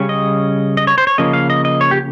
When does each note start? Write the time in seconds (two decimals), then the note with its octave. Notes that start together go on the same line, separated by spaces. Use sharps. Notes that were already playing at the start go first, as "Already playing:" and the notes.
Already playing: C#3 G3 C#4
0.09 D#5
0.77 D#5
0.87 C#5
0.98 C5
1.07 C#5
1.18 C#3 F3 A#3 C#4 D#5
1.33 F5
1.50 D#5
1.65 D#5
1.81 C#5
1.91 G4